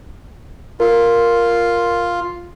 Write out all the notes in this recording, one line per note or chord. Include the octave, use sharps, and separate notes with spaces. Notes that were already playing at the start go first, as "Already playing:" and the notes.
F4 A#4